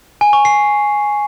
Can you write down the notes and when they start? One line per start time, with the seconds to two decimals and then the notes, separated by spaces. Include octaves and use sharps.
0.21 G#5
0.33 C#6
0.45 C7